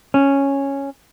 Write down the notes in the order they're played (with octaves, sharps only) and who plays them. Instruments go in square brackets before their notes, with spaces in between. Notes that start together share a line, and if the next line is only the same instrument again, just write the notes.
[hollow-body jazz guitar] C#4